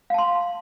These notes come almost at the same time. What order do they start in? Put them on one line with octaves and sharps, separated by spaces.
F5 A5 C6